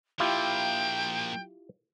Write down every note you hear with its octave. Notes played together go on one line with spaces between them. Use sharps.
A#2 F3 E4 F4 G4 G5